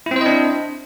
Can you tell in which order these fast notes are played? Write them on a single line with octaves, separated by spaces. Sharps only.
E4 C4 C5 D#5 D4